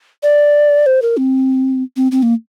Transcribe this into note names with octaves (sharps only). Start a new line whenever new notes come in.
D5
C5
A#4
C4
C4
C4
A#3